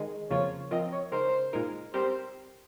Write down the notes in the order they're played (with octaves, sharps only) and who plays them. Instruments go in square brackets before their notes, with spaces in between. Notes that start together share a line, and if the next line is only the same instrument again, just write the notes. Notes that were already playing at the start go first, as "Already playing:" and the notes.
Already playing: [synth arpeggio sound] D#3 G#3 D#4 G#4
[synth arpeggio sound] F2 C#3 F3 A#3 F4 [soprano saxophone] C#5
[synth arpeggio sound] F3 C4 F4 A#4 [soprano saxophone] D#5
[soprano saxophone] C#5
[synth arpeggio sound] C#3 G#3 D#4 A#4 [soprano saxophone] C5
[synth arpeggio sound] A#2 G#3 D#4 A#4
[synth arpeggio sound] G3 C4 G4 A#4 [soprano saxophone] C5